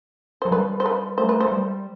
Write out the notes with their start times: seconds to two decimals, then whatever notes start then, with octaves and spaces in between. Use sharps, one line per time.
0.42 F#3 C5
0.51 G3 B4
0.80 C5
0.86 B4
1.18 A3 C5
1.29 B4
1.40 C5
1.46 A3
1.52 G3